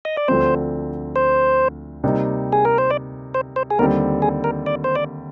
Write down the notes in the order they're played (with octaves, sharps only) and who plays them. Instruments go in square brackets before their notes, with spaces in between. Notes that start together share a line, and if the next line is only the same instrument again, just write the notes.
[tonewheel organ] D#5
D5
[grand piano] D2 D3 F3 C4 [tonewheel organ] C5
[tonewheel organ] C5
[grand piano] C3 G3 A#3 D#4
[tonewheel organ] G#4
A#4
C5
D5
C5
C5
G#4
[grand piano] D#2 D3 G3 C4 [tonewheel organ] A#4
[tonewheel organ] G#4
A#4
D5
C5
D5